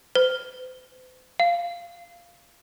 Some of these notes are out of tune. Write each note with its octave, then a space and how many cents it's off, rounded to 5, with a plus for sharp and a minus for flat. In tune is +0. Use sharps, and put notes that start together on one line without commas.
C5 -40
F5 -10